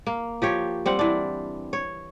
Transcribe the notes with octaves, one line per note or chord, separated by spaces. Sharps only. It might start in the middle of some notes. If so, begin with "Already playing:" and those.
A#3
F3 G4 C#5
G3 C4 F#5
E3 D4
C#5